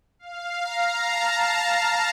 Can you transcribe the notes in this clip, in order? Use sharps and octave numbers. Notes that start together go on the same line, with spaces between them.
F5
A#5
A5